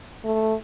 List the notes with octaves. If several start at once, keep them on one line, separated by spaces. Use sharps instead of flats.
A3